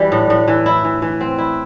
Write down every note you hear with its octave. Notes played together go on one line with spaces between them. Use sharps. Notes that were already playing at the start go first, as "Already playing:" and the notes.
Already playing: E3 G3
A2
A2
E3
E4
E3
E3
C4
E4